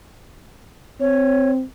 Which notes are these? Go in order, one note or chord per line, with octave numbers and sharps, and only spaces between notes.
C4 C#5